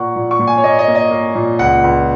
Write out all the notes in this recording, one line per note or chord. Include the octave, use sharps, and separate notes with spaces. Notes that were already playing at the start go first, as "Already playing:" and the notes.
Already playing: A#2 A#3 F#5 C#6
A#2
C#6
A#2
G#5
C#5
A#3 D#5
D#5
A#3
D#5
A#3
A#2
C#2 F#5
C#2